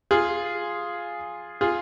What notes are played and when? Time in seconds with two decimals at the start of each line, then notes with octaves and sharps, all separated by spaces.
0.11 F4 G#4
1.61 F4 G#4